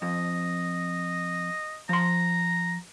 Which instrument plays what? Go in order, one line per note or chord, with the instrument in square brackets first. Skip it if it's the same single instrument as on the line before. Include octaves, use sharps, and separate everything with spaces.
[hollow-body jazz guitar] F2 [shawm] D#5
[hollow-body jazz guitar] F3 C6 [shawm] A#5